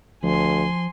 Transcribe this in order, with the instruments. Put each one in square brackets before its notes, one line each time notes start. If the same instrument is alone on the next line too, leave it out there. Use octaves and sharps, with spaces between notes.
[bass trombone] D2 [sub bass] F3 [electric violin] G#5 C6